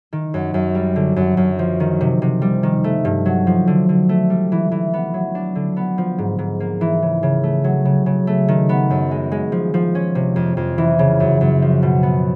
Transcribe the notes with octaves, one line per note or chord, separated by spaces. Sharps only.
D#3
F#2
F#2
G3
D3
F#2
F#2
F3
D#3
C3
C3
G3
D#3
A3
G2
F#3
F3
D3
D3
A3
G3
E3
E3
B3
F#3
D4
D3
B3
F3
G#2
G#2
A#3
E3
C#3
C#3
A3
F#3
C#3
C#3
A3
D#3
B3
F#2
G#3
G#3
F3
F3
C#4
C3
F2
F2
E3
C#3
F#2
F#2
F3
B2
B3